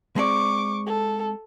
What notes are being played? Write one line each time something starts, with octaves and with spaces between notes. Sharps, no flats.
G#3 C4 D5 C#6 D6
A4